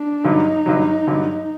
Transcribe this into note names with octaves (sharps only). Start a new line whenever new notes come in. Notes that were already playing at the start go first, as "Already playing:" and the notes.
Already playing: D4
G2 D3 F#3 D#4
G2 D3 F#3
G2 D3 F#3